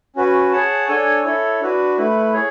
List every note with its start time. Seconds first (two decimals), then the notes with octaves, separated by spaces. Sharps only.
0.16 C#4 F#4 B4
0.52 G#4 C#5 F#5 A5
0.88 D4 A4 C#5 G#5
1.24 E4 A4 C#5
1.61 D4 F#4 B4
1.97 A3 E4 B4
2.34 G#4 C#5